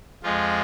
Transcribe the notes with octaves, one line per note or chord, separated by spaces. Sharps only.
F2 F3 G#3 F4